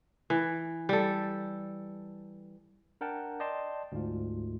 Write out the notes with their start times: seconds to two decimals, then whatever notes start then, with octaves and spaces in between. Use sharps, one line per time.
0.30 E3
0.89 G3 A4
3.01 D4 A#4 F#5 G5 A5
3.40 D5 D#5 G5 A5 C6
3.92 D2 G#2 F4